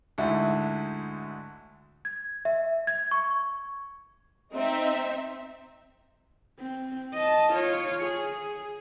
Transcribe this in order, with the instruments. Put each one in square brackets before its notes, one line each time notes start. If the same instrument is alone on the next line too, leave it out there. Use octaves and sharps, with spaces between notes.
[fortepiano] D2 G#2 E4
[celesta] G#6
E5
G#6
C#6
[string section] C4 D#4 E5
[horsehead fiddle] C4
D#5 A5
F4 C#5
G#4